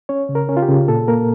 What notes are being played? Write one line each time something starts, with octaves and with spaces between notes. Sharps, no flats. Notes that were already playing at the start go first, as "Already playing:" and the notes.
C#4 C#5
C#3
A#4
C#4
F4
G4
C#3
A#2 A4
A#3 A#4